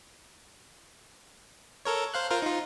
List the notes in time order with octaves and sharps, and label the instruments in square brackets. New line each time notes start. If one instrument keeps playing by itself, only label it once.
[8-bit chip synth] A4 A#4 C#5
C5 F5 F#6
F4 A#4 C5
D#4 F4